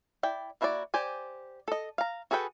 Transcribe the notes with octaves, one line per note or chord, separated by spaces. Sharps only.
E4 D5 G5
A#3 E4 F#4 B4 D5
G4 C5 D5 G#5
A4 D#5
F5 A#5
F#4 G#4 A4 B4 G5